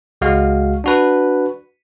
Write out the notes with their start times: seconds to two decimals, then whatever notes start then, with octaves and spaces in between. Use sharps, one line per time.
0.21 C#2 G#3 F#4 F5
0.84 D4 F#4 B4